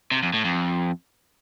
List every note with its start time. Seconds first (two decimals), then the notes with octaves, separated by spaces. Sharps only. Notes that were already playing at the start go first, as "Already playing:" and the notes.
0.11 C3
0.22 F2
0.33 A2
0.44 F2